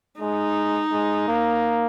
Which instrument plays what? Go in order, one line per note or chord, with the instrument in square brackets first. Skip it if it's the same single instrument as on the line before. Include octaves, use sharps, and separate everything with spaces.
[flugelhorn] G#3 [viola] D#4
[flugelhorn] G#3
A#3